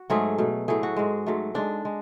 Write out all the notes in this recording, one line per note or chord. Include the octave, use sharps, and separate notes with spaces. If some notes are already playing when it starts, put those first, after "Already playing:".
Already playing: F#4
G#2 F#3 A3 G#4
B2 A3
A2 F#3 A3 G#4
F#4
G#2 G#3
G#2 F#3 A3
G#2 G#3 D4
G#3